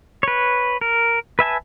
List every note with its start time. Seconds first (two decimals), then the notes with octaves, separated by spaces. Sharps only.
0.23 B4 C#5
0.81 A#4
1.39 B4 E5 G#5 A5